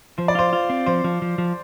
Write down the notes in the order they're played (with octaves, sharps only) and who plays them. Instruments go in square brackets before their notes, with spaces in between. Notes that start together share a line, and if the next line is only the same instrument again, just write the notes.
[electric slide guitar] F3 [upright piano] C5
[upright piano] D5
[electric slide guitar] F4 [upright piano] C5
[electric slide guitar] F4
C4
[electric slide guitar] F3 [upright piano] C5
[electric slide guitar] F3
F3
F3